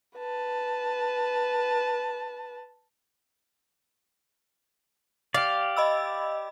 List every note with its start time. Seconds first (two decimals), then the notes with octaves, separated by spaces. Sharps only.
0.17 B4 A5
5.34 G4 D5 F5
5.77 D#5 B5 E6